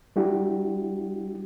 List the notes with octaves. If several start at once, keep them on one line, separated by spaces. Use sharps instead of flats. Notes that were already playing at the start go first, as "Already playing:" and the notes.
G3 D4 E4 F#4 G4